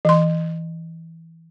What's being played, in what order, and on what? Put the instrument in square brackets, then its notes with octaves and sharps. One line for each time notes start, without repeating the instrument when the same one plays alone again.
[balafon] E3 C6